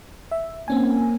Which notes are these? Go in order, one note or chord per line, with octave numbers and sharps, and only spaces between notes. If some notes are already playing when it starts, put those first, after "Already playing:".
E5
A#3 C4 C#4 G#5